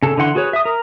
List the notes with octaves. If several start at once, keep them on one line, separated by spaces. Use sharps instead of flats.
C#3 A4
D3 E3 F#5 C6
F#4 G#4 B4 C#5
E5 D#6
A#4